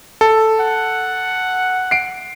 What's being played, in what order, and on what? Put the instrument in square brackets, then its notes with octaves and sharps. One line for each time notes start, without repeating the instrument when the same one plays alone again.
[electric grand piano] A4
[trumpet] F#5
[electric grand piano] C7 D7